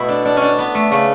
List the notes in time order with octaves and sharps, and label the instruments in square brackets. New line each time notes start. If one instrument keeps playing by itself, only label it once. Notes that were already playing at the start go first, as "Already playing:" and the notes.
Already playing: [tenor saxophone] B2 [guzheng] A3 E4
[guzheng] D4
D4
C#4
D4
B3
A3
[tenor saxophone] C#3 [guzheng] A3